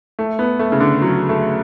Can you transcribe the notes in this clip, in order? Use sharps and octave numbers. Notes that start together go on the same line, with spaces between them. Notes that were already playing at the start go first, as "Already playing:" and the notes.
A3
B3
A3
C#3
D3
F#3
A3